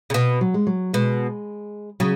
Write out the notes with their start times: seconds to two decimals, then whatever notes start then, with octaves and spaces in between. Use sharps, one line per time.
0.10 C#3
0.14 B2
0.41 F#3
0.54 G#3
0.67 F#3
0.93 B2 G#3
2.00 C#3 F#3